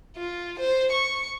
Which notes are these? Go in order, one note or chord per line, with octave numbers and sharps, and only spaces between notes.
F4
C5
C#6